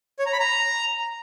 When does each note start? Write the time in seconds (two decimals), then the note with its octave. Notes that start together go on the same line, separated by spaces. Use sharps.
0.19 C#5
0.26 A#5
0.33 B5
0.39 A#5